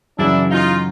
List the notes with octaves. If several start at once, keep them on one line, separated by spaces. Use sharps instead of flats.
F#2 C#3 E3 D4 E4
D#4 F4